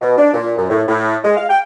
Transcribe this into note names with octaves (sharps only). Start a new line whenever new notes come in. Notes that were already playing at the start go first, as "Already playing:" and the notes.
B2
D4
A#2
F#2
A2
A2
G#3
F5
G5